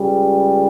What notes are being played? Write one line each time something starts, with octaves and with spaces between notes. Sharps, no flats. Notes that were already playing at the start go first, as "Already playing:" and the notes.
Already playing: C#2 C#3 G3